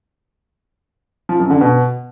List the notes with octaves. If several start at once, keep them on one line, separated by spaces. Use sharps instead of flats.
F3
F#2
D3
B2